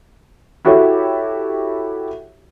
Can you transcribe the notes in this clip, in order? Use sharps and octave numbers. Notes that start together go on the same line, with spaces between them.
E4 F#4 G4 A4 C#5